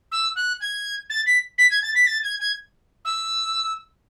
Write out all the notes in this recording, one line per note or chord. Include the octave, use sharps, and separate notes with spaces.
E6
F#6
G#6
A6
B6
B6
G#6
A6
B6
A6
G#6
G#6
E6